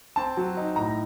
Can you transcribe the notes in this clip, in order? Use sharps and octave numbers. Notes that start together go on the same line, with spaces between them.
C4 A5
F#3
D#4
A2 A#5